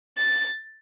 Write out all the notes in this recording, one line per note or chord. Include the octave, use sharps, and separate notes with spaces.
A6